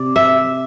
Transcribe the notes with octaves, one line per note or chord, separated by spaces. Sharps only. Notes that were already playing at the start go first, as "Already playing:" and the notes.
Already playing: C3 D5
E5